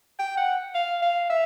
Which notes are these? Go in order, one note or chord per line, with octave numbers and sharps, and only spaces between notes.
G5
F#5
F5
F5
E5